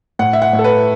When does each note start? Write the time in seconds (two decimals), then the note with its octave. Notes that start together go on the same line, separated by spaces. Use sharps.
0.19 A2 F#5
0.33 E5
0.42 F#5
0.53 A2
0.59 A4
0.64 B4